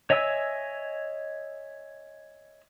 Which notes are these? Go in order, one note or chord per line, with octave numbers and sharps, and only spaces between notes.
C#5 D#5 E5 G#5 E6